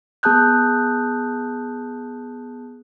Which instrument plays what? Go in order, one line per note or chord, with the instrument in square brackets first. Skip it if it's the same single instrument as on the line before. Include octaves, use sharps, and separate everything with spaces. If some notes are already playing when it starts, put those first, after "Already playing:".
[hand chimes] B3 G#4 A5 D#6 F#6 G6